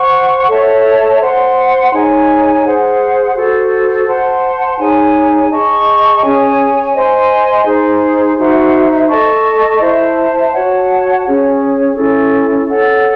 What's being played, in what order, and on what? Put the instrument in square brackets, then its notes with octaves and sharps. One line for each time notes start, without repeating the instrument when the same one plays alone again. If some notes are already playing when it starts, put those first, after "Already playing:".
Already playing: [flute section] C5 F#5 C#6
A4 C#5 E5 A5
C5 F#5 C6
D#4 G#4 C#5 G#5
G#4 C5 F#5
F#4 A4 C5
C5 F#5 A5 C6
D#4 G#4 C#5 G#5
G#4 D#5 A5 C#6
C#4 G#4 C#5 G#5
C5 D#5 G#5 C6
D#4 G#4 C5
D#4 F#4 C5 E5
A4 D#5 A5 C#6
E4 C5 E5 A5
F#4 C#5 F#5 A5
C#4 G#4 C#5
C#4 E4 A4
A4 C#5 F#5